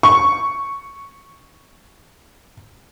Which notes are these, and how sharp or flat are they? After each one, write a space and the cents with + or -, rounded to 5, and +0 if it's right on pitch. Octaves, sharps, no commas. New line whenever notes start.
C#6 +0